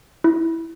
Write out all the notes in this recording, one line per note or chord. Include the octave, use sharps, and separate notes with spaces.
E4